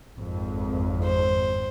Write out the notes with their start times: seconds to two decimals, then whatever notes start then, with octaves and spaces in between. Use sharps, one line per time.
0.17 G#1 F2
1.04 C5